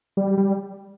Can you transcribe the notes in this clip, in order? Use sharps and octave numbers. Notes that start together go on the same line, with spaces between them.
G3
G3
G3